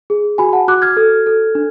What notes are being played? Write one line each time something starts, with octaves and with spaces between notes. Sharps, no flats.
G#4
F#4 G#5 B5
F#5 A5
F#4 D6 F#6
F6 G#6
A4
A4
D4